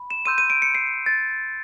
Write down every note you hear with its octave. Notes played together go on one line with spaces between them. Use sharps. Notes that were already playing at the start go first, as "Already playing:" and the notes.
Already playing: B5
E7
C6 E6 G6 D#7
D#7
D7
C#7
C7
A6